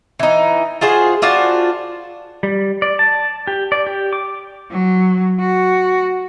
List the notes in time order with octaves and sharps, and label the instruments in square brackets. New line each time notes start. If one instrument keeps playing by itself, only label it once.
[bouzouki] E3 D#4
F4 F#4 G#4 C5
D4 F4 F#4 C5
[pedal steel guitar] G3
D5
A5
G4
D5
G4
D6
[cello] F#3
F#4